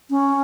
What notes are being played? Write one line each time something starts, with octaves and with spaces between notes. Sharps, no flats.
C#4